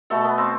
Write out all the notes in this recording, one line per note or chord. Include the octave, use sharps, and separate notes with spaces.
B2 A3 A4
B3
C4